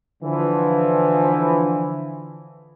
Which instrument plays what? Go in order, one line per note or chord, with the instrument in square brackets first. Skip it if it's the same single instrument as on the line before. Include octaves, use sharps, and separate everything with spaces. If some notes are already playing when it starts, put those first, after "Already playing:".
[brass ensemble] D3 E3 F3